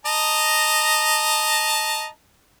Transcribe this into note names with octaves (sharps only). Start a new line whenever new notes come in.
D#5 A5 A#5